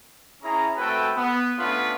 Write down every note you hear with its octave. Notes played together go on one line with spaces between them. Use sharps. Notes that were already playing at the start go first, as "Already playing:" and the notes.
C#4 E4 G#4 A#5
A3 C4 F#4 A4 B4 G5
B3
A3 B3 C#4 D4 F4 B4